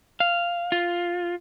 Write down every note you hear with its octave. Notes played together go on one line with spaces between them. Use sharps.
F5
F4